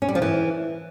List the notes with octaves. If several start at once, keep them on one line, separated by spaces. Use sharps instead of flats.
C#4
G3
F3
E3